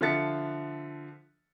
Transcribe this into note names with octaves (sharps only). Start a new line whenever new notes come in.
D3 F3 A4 E5 A6 C#7